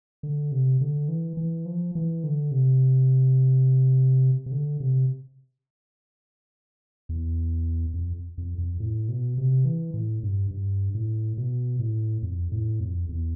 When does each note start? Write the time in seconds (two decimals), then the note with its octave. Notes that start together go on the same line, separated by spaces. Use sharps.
0.23 D3
0.52 C3
0.81 D3
1.08 E3
1.37 E3
1.65 F3
1.95 E3
2.24 D3
2.51 C3
4.46 C3
4.51 D3
4.80 C3
7.09 E2
7.94 F2
8.38 F2
8.58 F2
8.80 A2
9.08 B2
9.38 C3
9.65 E3
9.94 A2
10.23 G2
10.51 G2
10.95 A2
11.38 B2
11.79 A2
12.22 F2
12.52 A2
12.80 F2
13.09 E2